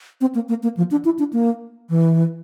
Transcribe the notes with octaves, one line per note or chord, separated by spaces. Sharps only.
C4
A#3
A#3
A#3
F3
D4
E4
D4
A#3
E3